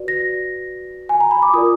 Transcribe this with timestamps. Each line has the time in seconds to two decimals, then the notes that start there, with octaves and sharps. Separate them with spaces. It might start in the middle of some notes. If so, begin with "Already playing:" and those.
Already playing: F#4 B4 D5
0.08 A#6
1.09 G#5
1.20 A#5
1.31 B5
1.42 D6
1.53 F4 A#4 D5 D#6